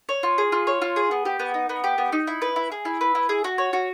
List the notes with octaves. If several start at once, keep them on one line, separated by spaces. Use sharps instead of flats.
C#5
F4
G#4
F4
C#5
F4
G#4
B3
G4
B3
D#4
B3
G4
B3
D#4
E4
B4
E4
G#4
E4
B4
E4
G#4
F#4
C#5
F#4